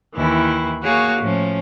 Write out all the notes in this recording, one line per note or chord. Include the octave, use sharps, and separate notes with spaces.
D#2 E3 E4
A#3 F#4 G#4 C#5 F5
A2 F3 C#4